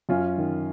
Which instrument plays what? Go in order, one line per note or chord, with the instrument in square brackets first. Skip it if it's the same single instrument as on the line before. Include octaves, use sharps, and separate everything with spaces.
[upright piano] F#2 C#4 F4
D#3